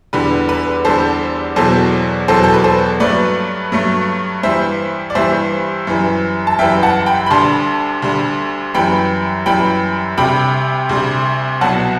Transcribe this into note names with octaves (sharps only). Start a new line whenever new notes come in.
E2 D3 G3 B4
B4
E2 D3 G3 A4 C5
E2 B2 F#3 A4 C5
E2 B2 F#3 A4 C5
A4
B4
A4 C5
G2 F#3 A3 B4 D5
G2 F#3 A3
G2 E3 G3 C5 E5
D5
G2 E3 G3 C5 E5
F#2 E3 G3
A5
F#2 E3 G3 E5 G5
F#5 A5
G5 B5
B5
D2 D3 G3 A5 C6
D2 D3 G3
F#2 E3 G3 G5 B5
F#2 E3 G3 G5 B5
D2 C3 G3 G5 B5
D2 C3 G3
C2 B2 F#3 F#5 A5